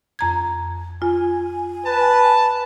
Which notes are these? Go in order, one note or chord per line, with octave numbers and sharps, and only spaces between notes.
F2 A#5 G#6
F4 G#5
B4 A5